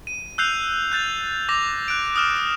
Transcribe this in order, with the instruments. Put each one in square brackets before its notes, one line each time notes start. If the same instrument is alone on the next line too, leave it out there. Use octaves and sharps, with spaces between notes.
[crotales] D#7
E6 F#6 G6 C7 F7
F#6 G6 A6 F7
D6 A#6 F7
F#6 D7
D#6 F6 E7